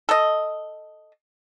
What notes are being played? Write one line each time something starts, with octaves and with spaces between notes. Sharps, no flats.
A4 D#5